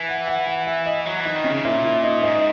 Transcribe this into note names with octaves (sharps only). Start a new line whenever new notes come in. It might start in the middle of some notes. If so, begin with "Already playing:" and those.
Already playing: E3 G#5
F#5
F#5
F#5
E5
D#5
F#3
E3 D#4
D#3
C#4
C#3
A#2 E4
E4
D#4
G#2 D#4